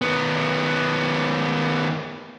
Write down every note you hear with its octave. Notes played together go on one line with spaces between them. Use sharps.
D#3 B3